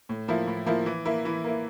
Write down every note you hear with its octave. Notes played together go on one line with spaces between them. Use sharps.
A2
F3 A#3 E4
A2
F3 A#3 E4
E3
A#3 E4
E3
A#3 E4